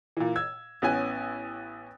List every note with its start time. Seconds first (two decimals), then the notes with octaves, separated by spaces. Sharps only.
0.17 A#2 E3
0.36 E6 G#6
0.82 A1 B3 C#4 G#5